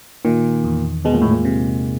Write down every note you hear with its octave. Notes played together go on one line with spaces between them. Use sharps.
A#2 D#3
E2
B2 G#3
A#2
A2
A#2
C3